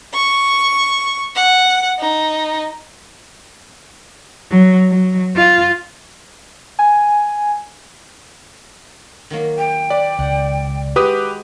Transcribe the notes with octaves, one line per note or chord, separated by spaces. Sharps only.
C#6
F#5
D#4
F#3
F#3
F4
G#5
D#3 F#3 A#3
G5
B4 D5
C#2 F#5
G#3 F#4 G4 B4 D#6